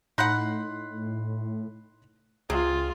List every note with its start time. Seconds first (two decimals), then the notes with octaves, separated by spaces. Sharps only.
0.18 A2 D#4 F#5 B5 C6 F#6
2.50 C#2 C3 F4 G#4